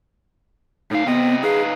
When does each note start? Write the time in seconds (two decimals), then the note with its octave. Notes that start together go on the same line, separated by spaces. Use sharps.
0.91 A2 D#4 F5
1.06 C3 B3 C4 D#5
1.43 D#4 G#4 B4 F5